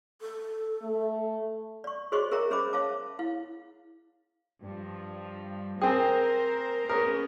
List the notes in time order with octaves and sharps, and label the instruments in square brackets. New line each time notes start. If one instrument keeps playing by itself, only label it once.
[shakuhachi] A4
[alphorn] A3
[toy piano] D5 C#6
F#4 G#4 C5 C#5 D#5 C#6
G#4 A#4 C#5 E5 G5 A#5
C#4 G#4 C5 D#5 B5 D6
C#5 E5 F5 A5 D6
E4 F5
[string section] G2 F3
[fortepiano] C4 G#4 [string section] A#4 C5 [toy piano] G5 A5
[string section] B3 C#4 [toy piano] G#4 D#6 [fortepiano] A#4